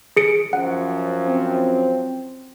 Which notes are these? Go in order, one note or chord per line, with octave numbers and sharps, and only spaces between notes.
G#4 C#7 D7
F#2 F3 F#5
C4